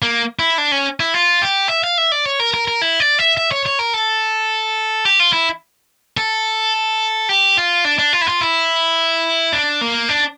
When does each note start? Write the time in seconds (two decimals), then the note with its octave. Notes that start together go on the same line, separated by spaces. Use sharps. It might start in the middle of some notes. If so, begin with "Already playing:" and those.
0.02 A#3
0.39 E4
0.58 D4
0.72 C#4
1.00 E4
1.14 F4
1.42 G4
1.69 E5
1.84 F5
1.98 E5
2.12 D5
2.26 C#5
2.40 A#4
2.54 A#4
2.68 A#4
2.82 E4
3.00 D5
3.19 E5
3.37 E5
3.52 C#5
3.66 C#5
3.79 A#4
3.94 A4
5.05 G4
5.20 F4
5.33 E4
6.17 A4
7.29 G4
7.57 F4
7.85 D4
7.99 D4
8.13 F4
8.21 E4
8.27 F4
8.41 E4
9.53 D4
9.81 A#3
10.09 D4